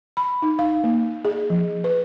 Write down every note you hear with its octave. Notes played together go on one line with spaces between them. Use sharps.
B5
D#4
F5
A#3
G#4
F3
B4